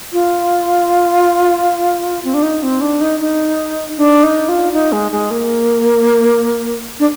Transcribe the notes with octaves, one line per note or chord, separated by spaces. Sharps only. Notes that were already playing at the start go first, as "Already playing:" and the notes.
F4
C4
D4
D#4
C4
D4
D#4
D#4
D4
D#4
F4
D#4
G#3
G#3
A#3
D4